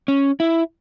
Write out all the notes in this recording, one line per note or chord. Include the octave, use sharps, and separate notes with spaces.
C#4
E4